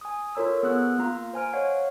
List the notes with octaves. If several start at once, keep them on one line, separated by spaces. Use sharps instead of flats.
G#5 D#6
F4 A4 A#4 C#5 A#5 E6
B3 G#4 E6 F#6
A#3 F4 F5 A#5
C5 G#5 F6 D7
C#5 D#5 F5 F#5